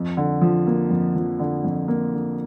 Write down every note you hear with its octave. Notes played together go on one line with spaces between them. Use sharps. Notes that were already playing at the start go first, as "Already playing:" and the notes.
Already playing: F2
D3
F3
A#3
F2
F3
D3
F2
A#3
D3